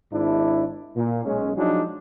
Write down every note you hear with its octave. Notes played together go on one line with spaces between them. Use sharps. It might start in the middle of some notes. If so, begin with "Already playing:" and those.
G#1 G#2 D4 E4
A#2
B1 G#3 C#4
F3 F#3 G#3 D4 D#4